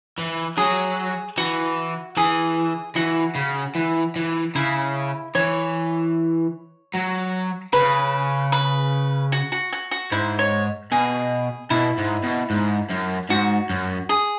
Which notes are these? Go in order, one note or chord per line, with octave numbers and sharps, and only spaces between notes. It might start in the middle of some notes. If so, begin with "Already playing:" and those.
E3
F#3 G#4
E3 F#4
E3 G#4
E3 F#4
C#3
E3
E3
C#3 E4
E3 C#5
F#3
C#3 B4
B4
F#4
F#4
F#4
F#4
G#2 E4
C#5
B2 G#4
B2 E4
G#2
B2
G#2
F#2
G#2 F#4
F#2
G#4